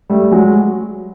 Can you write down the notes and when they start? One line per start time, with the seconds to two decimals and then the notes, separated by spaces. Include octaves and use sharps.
0.10 G3 A3
0.31 F#3 G#3